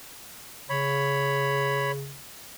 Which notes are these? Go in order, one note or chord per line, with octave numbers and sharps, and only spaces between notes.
C#3 C#5 B5